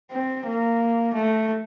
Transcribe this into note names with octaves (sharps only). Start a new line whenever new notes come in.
C4
A#3
A3